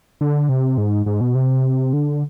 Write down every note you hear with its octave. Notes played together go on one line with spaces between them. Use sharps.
D3
C3
G#2
G#2
B2
C3
D3